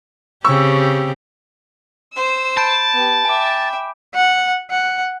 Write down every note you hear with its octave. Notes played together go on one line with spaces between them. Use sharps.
C#3 C4 G4 C#6 E6
C5 E6
A5 B5 G6 D7
B3 G4
E5 G5 G#5 D6
F#5
F#5